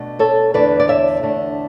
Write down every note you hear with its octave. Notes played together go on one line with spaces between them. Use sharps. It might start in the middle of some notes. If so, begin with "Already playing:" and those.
Already playing: B2 A3 D4
A4 C#5
E2 D3 A3 D4 B4 D5
D5
C#5 E5
E2 D3 A3 D4